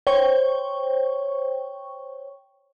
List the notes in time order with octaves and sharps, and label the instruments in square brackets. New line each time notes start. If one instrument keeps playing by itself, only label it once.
[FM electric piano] C5 C#5 G5 C#6